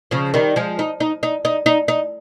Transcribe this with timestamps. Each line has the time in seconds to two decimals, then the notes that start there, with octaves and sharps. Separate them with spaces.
0.11 C#3 F3
0.34 D#3 G3
0.56 F3 G#3
0.79 D#4
1.00 D#4
1.23 D#4
1.45 D#4
1.66 D#4
1.88 D#4